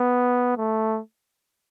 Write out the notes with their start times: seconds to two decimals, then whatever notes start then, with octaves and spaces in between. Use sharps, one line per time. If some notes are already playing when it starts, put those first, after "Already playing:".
Already playing: B3
0.57 A3